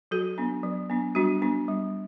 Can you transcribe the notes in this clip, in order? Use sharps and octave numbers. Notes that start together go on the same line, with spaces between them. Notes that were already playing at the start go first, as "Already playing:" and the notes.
F#3 F#4 A4
B3 D4
F#3
B3 D4
G3 D4 F#4
B3 D4
G3